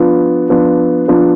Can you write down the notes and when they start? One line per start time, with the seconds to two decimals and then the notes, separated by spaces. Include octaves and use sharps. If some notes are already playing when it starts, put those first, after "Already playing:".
Already playing: F3 B3 D4 F4
0.49 F3 B3 D4 F4
1.08 F3 B3 D4 F4